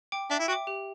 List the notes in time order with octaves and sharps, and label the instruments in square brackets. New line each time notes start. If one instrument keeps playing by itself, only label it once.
[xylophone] G5 D6
[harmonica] D4 [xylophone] E5
[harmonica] E4
[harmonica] F#4 [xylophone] G5 D6
[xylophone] G4